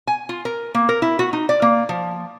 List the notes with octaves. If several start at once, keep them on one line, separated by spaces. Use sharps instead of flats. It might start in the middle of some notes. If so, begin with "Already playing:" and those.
G#5
F4
A#4
A#3
A#4
E4
F#4
D#4
D5
A#3
F3